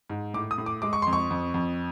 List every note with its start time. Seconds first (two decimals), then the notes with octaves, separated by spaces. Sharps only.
0.10 G#2
0.34 A2 D6
0.51 D#6
0.58 A2
0.66 D6
0.82 G#3 D6
0.93 C#6
1.02 F2 C6
1.13 C#6
1.30 F2
1.54 F2